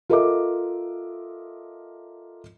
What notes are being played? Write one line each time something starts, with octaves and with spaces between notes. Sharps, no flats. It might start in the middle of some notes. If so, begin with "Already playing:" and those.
F4 A4 A#4 D#5 E5 D6